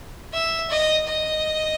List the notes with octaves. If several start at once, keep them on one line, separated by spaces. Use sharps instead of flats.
E5
D#5
D#5